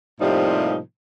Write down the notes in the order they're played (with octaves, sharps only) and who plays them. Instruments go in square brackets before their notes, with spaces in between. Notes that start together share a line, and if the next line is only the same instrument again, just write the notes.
[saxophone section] A2 C3 F3 G3 A#3 D#4